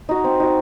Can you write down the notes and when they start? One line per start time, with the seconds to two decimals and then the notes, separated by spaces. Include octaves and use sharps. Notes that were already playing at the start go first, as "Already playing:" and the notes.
0.09 D#4 F#4
0.24 C4
0.40 D#4 F#4